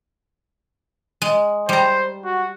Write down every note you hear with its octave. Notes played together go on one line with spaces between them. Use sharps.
G#3
G3 C5 A#5
F#4